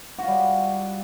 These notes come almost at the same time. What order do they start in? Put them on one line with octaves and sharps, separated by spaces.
F#4 F4 G3